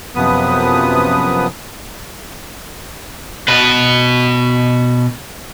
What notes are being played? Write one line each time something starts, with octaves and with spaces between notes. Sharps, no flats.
F#2 C3 F3 B3 B4 D#6
B2 B4